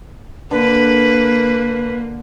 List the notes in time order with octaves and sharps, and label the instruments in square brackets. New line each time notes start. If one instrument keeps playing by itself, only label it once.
[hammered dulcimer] D3 [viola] A#3 [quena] B4